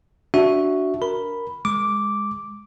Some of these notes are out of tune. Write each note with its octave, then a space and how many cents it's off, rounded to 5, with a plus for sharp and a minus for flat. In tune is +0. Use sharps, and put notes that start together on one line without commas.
D4 -10 F#4 +0 E5 +0
A#4 +0 B5 +0
G#3 -15 D6 -5